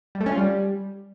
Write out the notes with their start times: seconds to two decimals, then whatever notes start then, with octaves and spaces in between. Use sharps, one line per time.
0.15 G3
0.21 A3
0.26 C#4
0.32 F4
0.37 G3